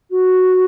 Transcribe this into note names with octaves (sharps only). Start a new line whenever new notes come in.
F#4